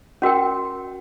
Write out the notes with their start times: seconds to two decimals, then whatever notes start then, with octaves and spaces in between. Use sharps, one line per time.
0.22 C#4 F#4 A#4 G5